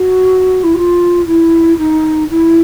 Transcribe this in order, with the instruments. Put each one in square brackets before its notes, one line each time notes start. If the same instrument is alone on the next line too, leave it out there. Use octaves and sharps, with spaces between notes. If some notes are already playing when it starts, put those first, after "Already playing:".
Already playing: [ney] F#4
E4
F#4
F4
E4
D#4
E4